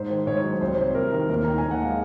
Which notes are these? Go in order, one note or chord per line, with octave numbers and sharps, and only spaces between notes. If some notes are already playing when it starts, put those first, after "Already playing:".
Already playing: G#2 C5
D#3
G#2 C#5
F#3
C2 C5
C3 C#5
C2 A#4
D#3 A#4
D#2 A#4
D#3 A#5
G#5
D#2
F#5
G#3 F5